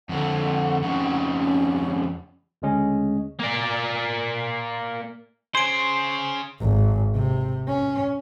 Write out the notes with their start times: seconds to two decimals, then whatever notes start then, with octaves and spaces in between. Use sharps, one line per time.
0.09 F2 D3 F#5
0.83 F2 C#3
1.39 C#4
2.62 D2 C#3 G#3 C#4 G#4 D#5
3.39 A#3 D5
5.55 C#3 G#4 C5 C6 D7
6.61 G#1
7.13 C3
7.67 C#4